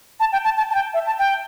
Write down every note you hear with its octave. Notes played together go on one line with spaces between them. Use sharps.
A5
G5
A5
A5
A5
G5
E5
A5
G5